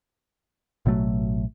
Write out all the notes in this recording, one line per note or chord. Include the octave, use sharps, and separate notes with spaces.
A1 B2 F#3 A3